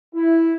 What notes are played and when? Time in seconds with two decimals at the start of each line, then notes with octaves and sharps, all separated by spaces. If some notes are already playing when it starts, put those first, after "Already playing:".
0.15 E4